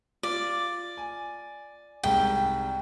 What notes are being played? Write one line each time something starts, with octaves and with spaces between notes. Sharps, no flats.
F4 D5
G#5
C2 G#2 G5